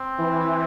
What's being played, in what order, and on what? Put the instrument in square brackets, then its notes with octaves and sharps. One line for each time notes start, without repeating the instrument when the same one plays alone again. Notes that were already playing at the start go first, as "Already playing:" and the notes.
Already playing: [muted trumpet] C4
[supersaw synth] E3